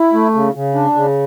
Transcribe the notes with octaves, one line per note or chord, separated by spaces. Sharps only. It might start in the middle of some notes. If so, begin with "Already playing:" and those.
Already playing: E4
A3
C#3
C#3
D4
C#3